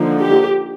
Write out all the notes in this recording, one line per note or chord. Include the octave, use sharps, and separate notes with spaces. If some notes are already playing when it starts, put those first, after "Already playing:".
Already playing: D3 F3 A#3 D#4
G4